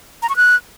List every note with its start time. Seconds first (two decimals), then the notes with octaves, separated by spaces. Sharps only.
0.22 A#5
0.29 C#6
0.36 F#6